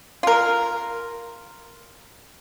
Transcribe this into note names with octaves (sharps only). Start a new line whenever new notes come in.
F4 A#4